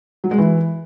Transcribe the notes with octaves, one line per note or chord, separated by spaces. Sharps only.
F#3
G#3
E3